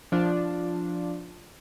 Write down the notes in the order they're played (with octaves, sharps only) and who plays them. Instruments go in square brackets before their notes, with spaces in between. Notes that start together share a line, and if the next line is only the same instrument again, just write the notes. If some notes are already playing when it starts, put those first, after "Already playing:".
[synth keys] F3 D4 F4